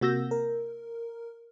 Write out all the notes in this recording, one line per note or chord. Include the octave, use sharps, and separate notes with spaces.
C3 A#3 F#4 E6 G6 A#6
A#4